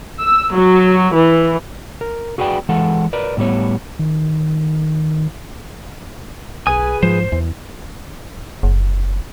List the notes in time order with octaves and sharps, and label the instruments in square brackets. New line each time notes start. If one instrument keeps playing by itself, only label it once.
[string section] E6
F#3
E3
[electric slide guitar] A#4
F#4 G#4 B4 D5 G5
E3 G#3 A4 F#5
A#4 B4 D5
A2 E3 G3 B3 C#5
[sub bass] D#3
[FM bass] B1 [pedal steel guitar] G#4 B4 D#6 [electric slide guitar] G#5
[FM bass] G#2 [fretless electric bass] F3 [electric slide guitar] C5
[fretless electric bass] E2 [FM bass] E3
[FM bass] F#1